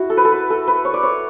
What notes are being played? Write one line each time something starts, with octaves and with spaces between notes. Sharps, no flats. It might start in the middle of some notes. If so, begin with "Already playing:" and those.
Already playing: E4 F#4
A4
B4
A4
B4
A4
B4
C#5
D5
C#5